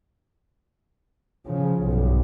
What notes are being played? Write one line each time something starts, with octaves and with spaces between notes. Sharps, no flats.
C#3 F3
B1 G2